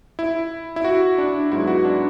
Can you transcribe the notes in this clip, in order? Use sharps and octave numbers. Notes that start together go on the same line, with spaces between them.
E4
E4
F#4
D4
G#2 F#3 B3 E4
F#4
D4